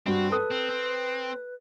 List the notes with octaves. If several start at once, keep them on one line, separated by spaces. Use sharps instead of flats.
G2 C4 F#4
A4 B4 D#6
C4
C4